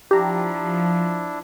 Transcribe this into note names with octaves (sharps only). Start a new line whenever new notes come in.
F3 D4 E4 G4 A#5